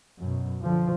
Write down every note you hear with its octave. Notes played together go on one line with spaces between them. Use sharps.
F#2 B2
D3 F3